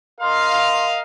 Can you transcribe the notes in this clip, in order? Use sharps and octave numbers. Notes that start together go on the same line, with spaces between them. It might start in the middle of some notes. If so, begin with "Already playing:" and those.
A#4 D#5 F5 C6